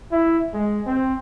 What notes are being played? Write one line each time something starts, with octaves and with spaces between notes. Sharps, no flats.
E4
G#3
C4